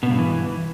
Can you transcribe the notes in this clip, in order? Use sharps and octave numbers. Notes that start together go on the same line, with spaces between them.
B2
G2
E3